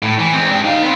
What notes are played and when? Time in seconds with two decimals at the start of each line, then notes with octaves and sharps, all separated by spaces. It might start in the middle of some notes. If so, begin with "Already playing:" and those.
0.03 A2
0.19 E3
0.33 G#3 C4
0.50 D4 G4
0.65 D#4 F5
0.82 B3 C4